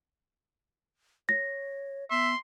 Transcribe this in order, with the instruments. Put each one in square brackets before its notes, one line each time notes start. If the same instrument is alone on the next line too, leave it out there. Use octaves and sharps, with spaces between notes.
[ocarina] C#5 [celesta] A#6
[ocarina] B3 [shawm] E5 [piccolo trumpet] C6